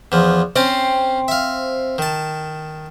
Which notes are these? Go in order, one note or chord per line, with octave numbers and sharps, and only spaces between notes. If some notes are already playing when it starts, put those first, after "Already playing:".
E2 F3
C4 C#4 C5
E5 F5
D#3 A5